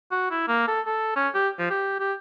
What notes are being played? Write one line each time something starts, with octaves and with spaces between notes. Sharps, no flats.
F#4
E4
A#3
A4
A4
C#4
G4
F3
G4
G4